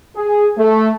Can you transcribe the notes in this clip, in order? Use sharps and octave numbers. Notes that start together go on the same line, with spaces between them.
G#4
A3